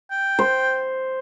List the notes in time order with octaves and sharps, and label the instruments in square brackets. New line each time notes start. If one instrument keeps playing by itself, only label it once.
[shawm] G5
[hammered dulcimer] C5